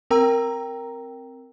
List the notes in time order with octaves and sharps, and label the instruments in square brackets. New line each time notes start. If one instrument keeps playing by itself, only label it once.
[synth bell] C4 A#4 G5 A#5 E6